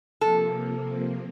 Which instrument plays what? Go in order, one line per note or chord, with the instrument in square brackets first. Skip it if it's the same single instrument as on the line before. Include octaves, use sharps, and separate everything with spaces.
[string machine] C3 F3 A#3 [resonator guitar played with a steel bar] A4